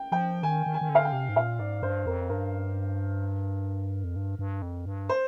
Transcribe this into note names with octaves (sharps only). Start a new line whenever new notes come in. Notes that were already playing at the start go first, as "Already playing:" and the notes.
Already playing: G5
F3 G5
D#3 G#5
D#3
G#5
D#3
D3
F5
G5
C3
G#2
A#2 F5
G#2 D5
G2 C5
F2 A#4
G2 A#4
F2
G2
G2
F2
G2
C5